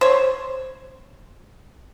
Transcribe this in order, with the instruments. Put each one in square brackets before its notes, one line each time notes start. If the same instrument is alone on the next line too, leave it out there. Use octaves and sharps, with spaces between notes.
[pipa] C5 C#5